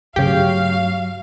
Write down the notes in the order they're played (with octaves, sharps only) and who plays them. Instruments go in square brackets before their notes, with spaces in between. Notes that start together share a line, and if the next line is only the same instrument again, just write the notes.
[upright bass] G2 A3 [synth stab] C#3 G4 [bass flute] F#3 [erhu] F5